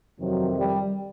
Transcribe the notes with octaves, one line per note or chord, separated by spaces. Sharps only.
F2 C3 D#3 F#3
G3